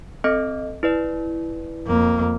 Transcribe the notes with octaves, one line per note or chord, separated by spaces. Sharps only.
C4 A4 D#5
E4 B4 D5
F2 A#3